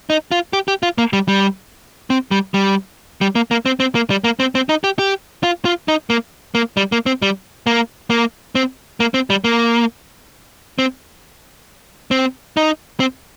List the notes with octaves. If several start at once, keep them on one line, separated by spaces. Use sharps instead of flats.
D#4
F4
G4
G4
F4
A#3
G3
G3
C4
G3
G3
G3
A#3
A#3
C4
C4
A#3
G3
A#3
C4
C4
D#4
G4
G4
F4
F4
D#4
A#3
A#3
G3
A#3
C4
G3
A#3
A#3
C4
A#3
C4
G3
A#3
C4
C4
D#4
C4